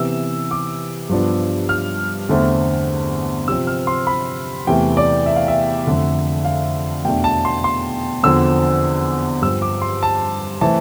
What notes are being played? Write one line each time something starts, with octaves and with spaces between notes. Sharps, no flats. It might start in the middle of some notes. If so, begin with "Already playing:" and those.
Already playing: C3 E3 B3 E6
D6
G2 F3 B3 D4
F6
E2 D3 A3 C4
C3 F3 C4 E6
F6
C6
B5
E2 C3 E3 A3 G5
D5
E5
F5
E5
F2 D3 A3
F5
E2 B2 A3 D4 G5
A5
C6
C6
E2 D3 F3 C4 E6
G2 F3 C4 E6
D6
C6
A5
E3 A3 C4 A5